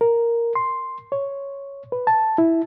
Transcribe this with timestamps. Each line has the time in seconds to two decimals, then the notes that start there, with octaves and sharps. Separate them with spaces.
0.01 A#4
0.55 C6
1.12 C#5
1.92 B4
2.07 A5
2.38 E4